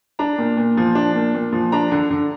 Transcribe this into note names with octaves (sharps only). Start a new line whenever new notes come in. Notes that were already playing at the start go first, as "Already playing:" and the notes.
D4 A#5
A#2
A#2
F3
D4
A#2
A#2
F3
D4 A#5
D3
D3